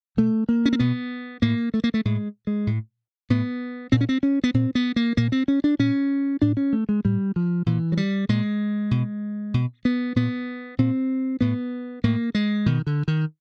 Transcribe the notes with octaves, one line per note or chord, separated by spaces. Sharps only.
B2 A3
A#3
C#4
C4
B2 B3
A2 A#3
A3
A#3
A3
A2 G#3
G#3
A2
A2 B3
A#2 C4
C#4
C4
C#4
B3
A#2 C4
B3
A#3
A#2 A#3
C4
C#4
D4
A#2 C#4
A2 D4
C#4
A3
G#3
A2 G3
F3
A#2 E3
F#3
G3
A#2 G#3
B2
B2
B3
A#2 B3
A#2 C4
A2 B3
A2 A#3
G#3
B2 D#3
D3
D#3